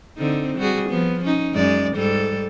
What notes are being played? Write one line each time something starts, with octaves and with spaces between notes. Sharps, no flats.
D3 C4 D#4
G3 F#4 G#4
F3 B3
C#4 D#4
F#2 G#3 D5
G#2 G3 A4